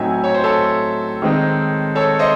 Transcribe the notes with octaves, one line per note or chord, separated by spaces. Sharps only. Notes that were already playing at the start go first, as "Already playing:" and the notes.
Already playing: A2 F#3 C4 D#4 E5 G#5
C#5
C5
A4 C#5
D#3 G#3 C4 D#4
A4 C#5
C5 D#5